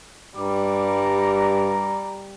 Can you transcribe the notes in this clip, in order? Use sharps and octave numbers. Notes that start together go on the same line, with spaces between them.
G2 G3 A#5 D6